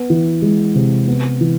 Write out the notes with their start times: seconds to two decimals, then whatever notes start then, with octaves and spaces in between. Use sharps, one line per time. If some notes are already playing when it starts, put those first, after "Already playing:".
Already playing: B3
0.10 E3
0.42 G#3
0.75 C3
1.07 B3
1.41 E3